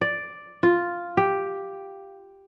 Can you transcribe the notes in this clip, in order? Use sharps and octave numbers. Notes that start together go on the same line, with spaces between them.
D5
F4
G4